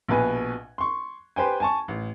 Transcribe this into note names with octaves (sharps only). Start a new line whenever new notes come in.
A#1 B2 B4 G#5
C6 C#6
G4 B4 C5 G5 G#5
G#5 A5 C#6
A1